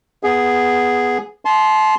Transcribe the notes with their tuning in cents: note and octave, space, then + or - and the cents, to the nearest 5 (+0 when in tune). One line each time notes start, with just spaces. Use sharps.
B3 +0 G#4 +0
A5 -30 C6 +0